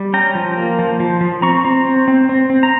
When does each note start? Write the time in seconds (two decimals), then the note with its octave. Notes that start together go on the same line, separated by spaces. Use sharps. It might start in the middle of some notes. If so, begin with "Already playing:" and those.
Already playing: G3
0.13 C#4 G5 A#5
0.35 F3
0.56 A#3
0.79 F3
1.00 F3
1.21 F3
1.42 C4 A#5 C#6
1.65 C4
1.85 C4
2.08 C4
2.29 C4
2.50 C4
2.63 A#5